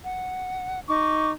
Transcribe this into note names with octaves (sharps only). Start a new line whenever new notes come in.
F#5
D#4 C#6 D6